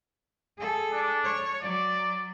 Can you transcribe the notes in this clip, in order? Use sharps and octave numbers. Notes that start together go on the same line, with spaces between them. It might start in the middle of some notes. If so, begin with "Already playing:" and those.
G#4 A4
D4
C#5
F#3 D5